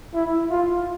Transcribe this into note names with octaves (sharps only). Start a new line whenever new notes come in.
E4
F4